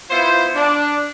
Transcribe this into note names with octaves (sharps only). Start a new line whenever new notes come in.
B3 E4 F4 C5
D4